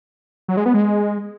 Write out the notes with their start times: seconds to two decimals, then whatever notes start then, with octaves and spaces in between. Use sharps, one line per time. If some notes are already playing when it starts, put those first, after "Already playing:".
0.48 F#3
0.57 G#3
0.66 B3
0.74 G#3